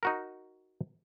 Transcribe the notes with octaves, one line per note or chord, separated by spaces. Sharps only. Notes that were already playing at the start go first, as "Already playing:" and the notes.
D#4 F#4 A#4